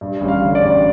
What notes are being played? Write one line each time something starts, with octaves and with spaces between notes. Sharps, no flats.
G2
A1
F5
D3
D5
A1